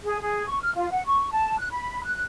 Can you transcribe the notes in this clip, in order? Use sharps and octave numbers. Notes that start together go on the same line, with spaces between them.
G#4
G#4
C#6
F6
F4
F#5
C#6
A5
F#6
B5
F#6